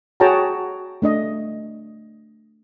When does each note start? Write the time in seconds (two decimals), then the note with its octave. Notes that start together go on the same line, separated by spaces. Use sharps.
0.20 F#4 G#4 C#5 G5 A5 A#5
1.02 A3 D4 D#5